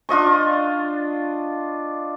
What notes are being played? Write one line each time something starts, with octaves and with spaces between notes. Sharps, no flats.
D4 F4 D#5 C#6